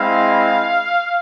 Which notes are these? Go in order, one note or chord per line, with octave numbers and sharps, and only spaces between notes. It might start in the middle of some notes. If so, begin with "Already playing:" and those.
Already playing: G#3 C4 E4 F5